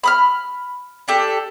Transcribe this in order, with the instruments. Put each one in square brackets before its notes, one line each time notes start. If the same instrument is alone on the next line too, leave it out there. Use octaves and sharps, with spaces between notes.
[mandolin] B5 D#6 F6
D4 G4 A4